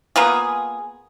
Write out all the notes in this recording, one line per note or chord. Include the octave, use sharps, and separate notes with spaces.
A#3 B3 F4 G#4